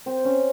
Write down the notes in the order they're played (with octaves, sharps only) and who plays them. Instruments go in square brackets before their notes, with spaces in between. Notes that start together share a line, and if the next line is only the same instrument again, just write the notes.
[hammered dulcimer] C4
C#4